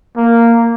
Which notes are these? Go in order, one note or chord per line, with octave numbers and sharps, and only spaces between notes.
A#3